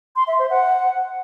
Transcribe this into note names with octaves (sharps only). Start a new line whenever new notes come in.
C6
E5
C5
F#5